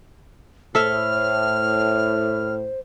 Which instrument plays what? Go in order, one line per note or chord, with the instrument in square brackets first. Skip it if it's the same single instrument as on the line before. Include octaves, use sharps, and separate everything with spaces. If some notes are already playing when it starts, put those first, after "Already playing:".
[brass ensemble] A2 [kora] A4 E5 [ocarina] C5 [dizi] F6